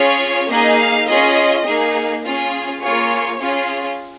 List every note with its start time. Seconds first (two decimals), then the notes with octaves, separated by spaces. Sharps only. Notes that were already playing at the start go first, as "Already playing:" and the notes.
Already playing: C#4 F4 G#4 C#5
0.50 A#3 D#4 G#4 D#5
0.78 F5
1.08 C#4 F4 G#4 D#5
1.65 A#3 D#4 G#4
2.24 C#4 F4 G#4
2.81 A#3 F4 G#4 C#5
3.39 C#4 F4 G#4